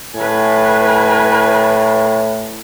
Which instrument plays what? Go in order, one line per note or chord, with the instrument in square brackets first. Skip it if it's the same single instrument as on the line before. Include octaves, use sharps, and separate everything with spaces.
[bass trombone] A2 [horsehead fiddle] B4 G#5